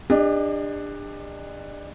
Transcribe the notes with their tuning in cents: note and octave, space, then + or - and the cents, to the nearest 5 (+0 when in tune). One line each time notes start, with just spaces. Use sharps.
D4 +10 G4 +45 D#5 -5